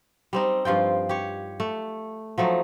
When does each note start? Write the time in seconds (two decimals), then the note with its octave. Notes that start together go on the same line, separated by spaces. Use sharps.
0.33 G3 C4 D#4
0.65 G2 F3 F4 G5
1.09 G4 C#5
1.60 A3
2.38 F3 F#3 A3 D#4